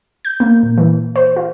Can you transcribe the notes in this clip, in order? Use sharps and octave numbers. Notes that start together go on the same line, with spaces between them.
G6
A#3
A#2
E3
C5
F4